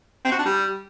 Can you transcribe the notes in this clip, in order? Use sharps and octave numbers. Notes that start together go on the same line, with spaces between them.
C4
F#4
D4
G3